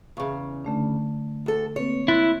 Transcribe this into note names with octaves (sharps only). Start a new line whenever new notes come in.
E2 C#3 F5 C#6
D3 A3 D4
D2 A4
A#3 C4 B4 C#5
E4 C6 F#6 A6